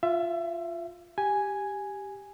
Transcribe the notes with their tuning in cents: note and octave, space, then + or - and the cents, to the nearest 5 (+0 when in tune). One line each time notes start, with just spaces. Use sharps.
F4 +0 E5 +25
G4 +0 G#5 +0